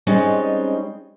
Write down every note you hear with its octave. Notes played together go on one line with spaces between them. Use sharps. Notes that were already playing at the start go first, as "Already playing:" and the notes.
G3 G#3 C4 C#4 D#4